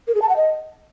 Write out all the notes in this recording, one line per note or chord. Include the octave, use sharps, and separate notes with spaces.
A#4
G#4
A5
F#5
D#5